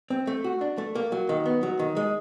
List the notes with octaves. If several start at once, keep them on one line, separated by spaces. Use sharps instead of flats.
C4
A3
F#4
D4
A3
A#3
F#3
D#3
B3
F#3
D#3
G#3